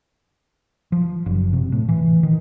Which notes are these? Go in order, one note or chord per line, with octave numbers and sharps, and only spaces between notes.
F3
F#1
C3
A2
E3
D#3